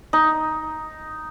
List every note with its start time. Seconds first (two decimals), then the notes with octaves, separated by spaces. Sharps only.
0.13 D#4